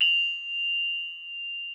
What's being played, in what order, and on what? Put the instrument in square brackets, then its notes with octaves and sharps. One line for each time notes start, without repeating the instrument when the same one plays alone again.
[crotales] F7 F#7